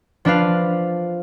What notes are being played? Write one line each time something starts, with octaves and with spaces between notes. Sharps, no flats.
F3 D4 B4 F5